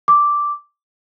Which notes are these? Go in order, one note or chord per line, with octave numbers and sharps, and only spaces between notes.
D6